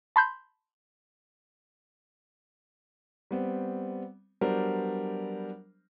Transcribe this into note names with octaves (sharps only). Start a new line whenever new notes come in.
A5 B5 C6 G6
G3 B3 C4
F#3 G3 B3 D4 A#4 C5